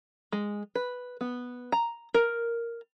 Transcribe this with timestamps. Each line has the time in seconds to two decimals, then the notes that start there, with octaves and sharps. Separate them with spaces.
0.32 G#3
0.75 B4
1.21 B3
1.72 A#5
2.14 A#4